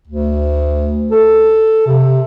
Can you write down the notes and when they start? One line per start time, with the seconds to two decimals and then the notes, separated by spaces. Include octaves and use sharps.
0.07 D2
1.11 A4
1.86 C3